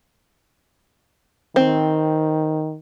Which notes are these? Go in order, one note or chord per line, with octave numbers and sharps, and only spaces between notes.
D#3 C4